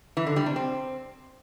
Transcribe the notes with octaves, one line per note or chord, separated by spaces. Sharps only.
E3
D3
G3
C3
C4